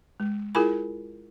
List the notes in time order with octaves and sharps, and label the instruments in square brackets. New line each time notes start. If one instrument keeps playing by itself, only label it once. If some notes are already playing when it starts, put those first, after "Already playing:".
[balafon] G#3
E4 F4 G#4 A#4 G#5 B5